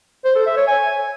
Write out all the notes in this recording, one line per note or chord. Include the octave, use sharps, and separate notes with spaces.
C5
A4
E5
C#5
G#5